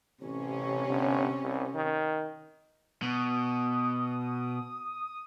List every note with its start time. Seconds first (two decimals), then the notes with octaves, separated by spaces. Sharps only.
0.21 A1 C3 C#4
0.88 G1
1.42 C2
1.75 D#3
3.02 B2 D#6